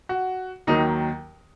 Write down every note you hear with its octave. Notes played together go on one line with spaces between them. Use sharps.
F#4
D#2 D#3 F#3 D#4